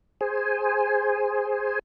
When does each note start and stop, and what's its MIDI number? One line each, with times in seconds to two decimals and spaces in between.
0.21 1.79 68
0.21 1.79 72
0.21 1.79 80